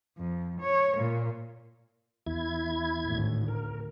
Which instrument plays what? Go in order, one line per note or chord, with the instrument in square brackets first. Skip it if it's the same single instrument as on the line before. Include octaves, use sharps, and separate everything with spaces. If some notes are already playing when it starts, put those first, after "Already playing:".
[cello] F2
C#5
A#2
[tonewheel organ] E2 E4 G#6
[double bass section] G#1 D2 A2
[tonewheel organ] A#4